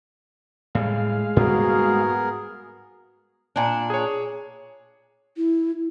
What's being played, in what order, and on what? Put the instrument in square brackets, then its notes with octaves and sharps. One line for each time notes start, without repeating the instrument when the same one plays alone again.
[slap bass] A2 G3 [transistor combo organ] G#3 F5
[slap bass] G#2 G3 A#3 [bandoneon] B3 G#4 A#4 [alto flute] F#4
[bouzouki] A#2 D4
[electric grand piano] G#4 C#5
[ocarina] E4